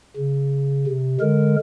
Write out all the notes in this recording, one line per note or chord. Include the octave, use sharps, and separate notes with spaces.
C#3
C3
D3 G#3 A#4